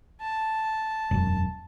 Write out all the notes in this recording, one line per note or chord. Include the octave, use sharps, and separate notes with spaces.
A5
E1 F#2